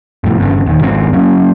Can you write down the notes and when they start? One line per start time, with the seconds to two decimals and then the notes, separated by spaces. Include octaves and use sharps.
0.24 F2 A2 C3
0.37 G1 G2 C#3
0.66 D#1 D#3
0.81 G#1 C#2 C3 C4
1.13 F#3 A#3 C#4